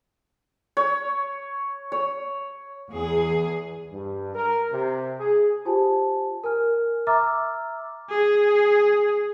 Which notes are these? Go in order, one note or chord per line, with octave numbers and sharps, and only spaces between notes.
C#5
C#5
E2 G#4
G2
A#4
C3
G#4
F4 G4 C5 G#5 A5
A#4 G#5 F6
E5 A#5 D6 E6 F6 A6
G#4